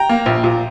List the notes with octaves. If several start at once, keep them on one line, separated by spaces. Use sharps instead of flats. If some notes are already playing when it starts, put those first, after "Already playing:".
Already playing: G5 A#5
A#3
A#1
A#2